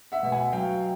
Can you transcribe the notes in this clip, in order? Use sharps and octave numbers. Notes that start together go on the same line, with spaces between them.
E5 F#5
B2
F#5 G#5
F#3 F5 G5